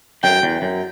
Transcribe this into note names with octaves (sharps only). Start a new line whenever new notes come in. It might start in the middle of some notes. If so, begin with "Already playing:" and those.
F#2 G5
E2
F#2